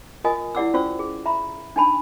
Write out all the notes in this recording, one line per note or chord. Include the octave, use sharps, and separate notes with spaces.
F4 A#4 D#5 G#5 D#6
E4 G4 D5 F#5 D6 E6
C#4 F4 C5 D5 C#6 E6
G#4
E5 A#5 B5
D4 D#4 G#5 A5 B5